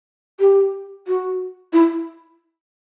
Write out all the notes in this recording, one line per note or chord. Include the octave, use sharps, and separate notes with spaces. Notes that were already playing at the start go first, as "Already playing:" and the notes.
G4
F#4
E4